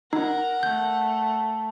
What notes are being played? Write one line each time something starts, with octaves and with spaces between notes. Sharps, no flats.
D#4 A#4 F#5
A3 G6